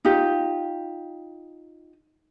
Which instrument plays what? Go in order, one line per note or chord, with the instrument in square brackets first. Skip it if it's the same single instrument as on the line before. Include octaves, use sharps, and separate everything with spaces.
[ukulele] D#4 F4 G4